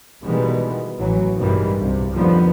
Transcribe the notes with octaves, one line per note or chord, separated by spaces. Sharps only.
B2 D#3 E3 G3 G#3 B3
A1 E3 F#3
G2 B2 D#3 E3 G3 G#3
C2 G2 C3
F2 D3 D#3 F3 G3 B3